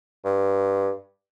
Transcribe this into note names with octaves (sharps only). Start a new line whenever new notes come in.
G2